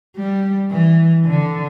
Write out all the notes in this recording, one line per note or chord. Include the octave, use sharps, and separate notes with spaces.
G3
E3
D3